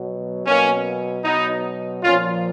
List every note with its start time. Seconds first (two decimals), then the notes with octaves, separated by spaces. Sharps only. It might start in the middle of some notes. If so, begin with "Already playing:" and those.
Already playing: B2 F#3
0.45 B2 F#3 A#3 C#4
1.24 B2 F#3 B3 D#4
2.04 A#2 F3 C#4 F4